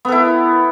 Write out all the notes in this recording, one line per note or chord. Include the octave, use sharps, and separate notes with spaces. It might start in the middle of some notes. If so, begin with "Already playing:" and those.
B3 E4 A4